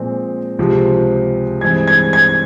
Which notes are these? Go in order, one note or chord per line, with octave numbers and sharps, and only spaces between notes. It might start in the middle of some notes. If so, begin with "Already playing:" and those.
Already playing: A#2 F3 G#3 C4
C#2 C3 F3 C4
G2 E3 G#3 C4 G#6
G#6
G#6